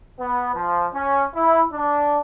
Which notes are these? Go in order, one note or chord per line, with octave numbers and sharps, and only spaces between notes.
B3
F3
C#4
E4
D4